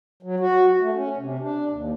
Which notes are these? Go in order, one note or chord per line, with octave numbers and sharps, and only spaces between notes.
F#3
F#4
A3
C#4
C3
D4
D#2